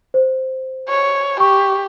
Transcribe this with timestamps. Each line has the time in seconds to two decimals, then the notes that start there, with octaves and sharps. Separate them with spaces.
0.14 C5
0.89 C#5
1.40 G4 C#6